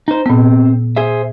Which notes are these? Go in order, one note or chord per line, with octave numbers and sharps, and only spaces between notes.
D#4 C5
A#2 B3 C4
G#4 C5 E5